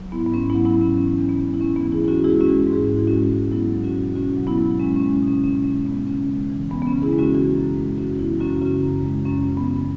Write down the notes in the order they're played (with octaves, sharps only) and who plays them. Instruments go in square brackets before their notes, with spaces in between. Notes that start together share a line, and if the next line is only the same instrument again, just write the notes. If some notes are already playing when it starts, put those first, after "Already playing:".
Already playing: [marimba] F#3
G#2 B3 E4
B3
G#2 C#4
B3 E4
F#3
B3 E4
F#3
C#4
E3 C#4
E2 C#4
B3
G#3
E4
E2 C#4
B3 E4
E3
E4 G#4
E2 E4
C#4 F#4
F#4
G#3 E4 G#4
C#4 F#4
G#3
G#2
G#4
G#2 F#4
E4
G#3 C#4 F#4
G#3
F#3 B3 E4
F#3
C#4 F#4
B2
B2 C#4 F#4
F#3
B3 E4
F#3
G#3 C#4
G#3 C#4
C#4
B2
C#4
B2 C#4
G#3 C#4
G#3 B3
C#3 C#4
G#3
E3
E2 B3
B3
C#4
C#3
E4 G#4
G#3
C#4 F#4
E3 C#4 F#4
F#2
G#3
F#2 C#4 F#4
E3 B3 E4
F#2 C#4 F#4
C#3 C#4 F#4
F#2
G#3
F#2 C#4
C#3
B3
F#2